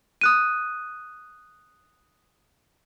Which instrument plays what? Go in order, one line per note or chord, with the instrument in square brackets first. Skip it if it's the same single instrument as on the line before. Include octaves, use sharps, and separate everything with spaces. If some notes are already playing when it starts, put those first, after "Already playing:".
[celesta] D#6 F#6 D#7